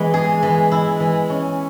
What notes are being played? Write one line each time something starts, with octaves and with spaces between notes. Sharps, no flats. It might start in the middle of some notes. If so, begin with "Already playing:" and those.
Already playing: E3 G#3 B3
G#4
E3
E4
E3
C#4